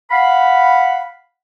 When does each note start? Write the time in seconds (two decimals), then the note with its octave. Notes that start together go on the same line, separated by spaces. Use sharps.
0.11 F5 F#5 B5